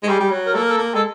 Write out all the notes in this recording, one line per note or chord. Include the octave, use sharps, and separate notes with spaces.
G#3
G3 G#4
G3
F#3
A#4
A#3 A4
A#4
A4
A#3
G#3 A4